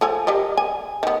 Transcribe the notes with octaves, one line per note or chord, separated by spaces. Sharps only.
F3 A4 G#5
G3 A#4 D#5
G#5
D#3 B3